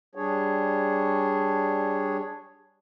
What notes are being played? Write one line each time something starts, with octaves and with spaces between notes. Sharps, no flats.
G3 D4 G#4 C#5